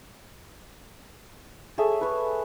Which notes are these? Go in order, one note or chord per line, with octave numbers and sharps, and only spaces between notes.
G#4 A4 C#5 E5
B4 C#5